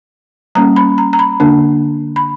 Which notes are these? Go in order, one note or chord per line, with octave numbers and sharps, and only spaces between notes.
G3 A#3 C#4 A#5
B5
A#5
A#5
B5
D3 A#3 D4
B5